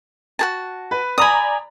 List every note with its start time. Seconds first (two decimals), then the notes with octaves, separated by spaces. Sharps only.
0.39 F#4 G#4 A5
0.91 B4
1.18 D5 G#5 A#5 B5 D#6